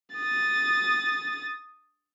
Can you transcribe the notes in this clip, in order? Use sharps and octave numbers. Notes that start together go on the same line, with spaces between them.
D#6 A6